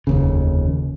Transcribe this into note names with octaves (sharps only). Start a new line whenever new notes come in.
F1 D#2 C#3